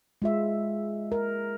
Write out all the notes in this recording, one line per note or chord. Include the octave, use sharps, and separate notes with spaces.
G#3 F4 E5
A#4